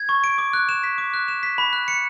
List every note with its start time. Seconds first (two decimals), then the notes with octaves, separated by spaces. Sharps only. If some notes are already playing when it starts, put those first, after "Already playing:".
Already playing: G#6
0.09 C#6
0.24 D7
0.38 D6
0.53 F#6
0.69 E7
0.84 B6
0.98 D6
1.14 F#6
1.28 E7
1.43 B6
1.58 B5
1.73 F#6
1.88 C#7